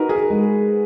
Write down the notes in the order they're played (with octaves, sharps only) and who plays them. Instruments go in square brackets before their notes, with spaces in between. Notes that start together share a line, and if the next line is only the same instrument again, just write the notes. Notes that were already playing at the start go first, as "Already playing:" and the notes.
Already playing: [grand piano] D#4 [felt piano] F#4 A#4 B4
[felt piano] G#4
A#4
[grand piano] G#3